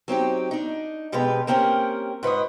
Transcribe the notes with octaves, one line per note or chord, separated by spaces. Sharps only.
F#3 C4 D#4 G4
D4 D#4
F2 B2 G#3 G4 B4
A#3 C4 C#4 G4 G#4 A#4
G#2 B4 C#5 D#5